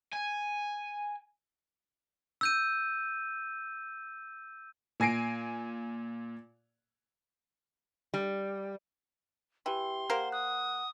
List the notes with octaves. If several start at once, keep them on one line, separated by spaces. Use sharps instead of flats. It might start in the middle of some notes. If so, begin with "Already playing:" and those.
G#5
E6 G6 D#7
A#2 G#5 A#6 C7 D7
G3
E3 G4 G5 C6
A#3 A#4 C5 F#5
D#6 F#6